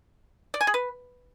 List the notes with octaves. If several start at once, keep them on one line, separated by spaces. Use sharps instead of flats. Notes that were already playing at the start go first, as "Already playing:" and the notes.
D5
G#5
G#4
B4